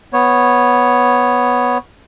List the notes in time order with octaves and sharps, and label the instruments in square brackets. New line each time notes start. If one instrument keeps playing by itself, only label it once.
[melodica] B3 C#5